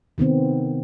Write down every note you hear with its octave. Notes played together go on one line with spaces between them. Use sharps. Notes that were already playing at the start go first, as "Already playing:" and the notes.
C3 D#3 B3 C4